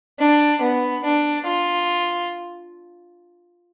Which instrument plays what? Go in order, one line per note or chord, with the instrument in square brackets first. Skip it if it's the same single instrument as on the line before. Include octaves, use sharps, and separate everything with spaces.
[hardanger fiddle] D4
B3
D4
F4